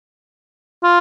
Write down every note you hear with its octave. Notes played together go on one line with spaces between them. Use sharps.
F4